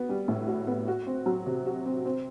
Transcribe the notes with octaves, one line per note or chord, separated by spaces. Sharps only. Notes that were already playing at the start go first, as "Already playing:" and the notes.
Already playing: B3 F#4
G3
A2
F#4
B3
F#4
C4
F#3
C3
F#4
C4
C4